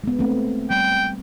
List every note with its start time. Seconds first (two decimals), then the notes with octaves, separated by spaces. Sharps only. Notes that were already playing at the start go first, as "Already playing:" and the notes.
0.04 G#3 B3
0.19 A3 C4
0.70 G3 G5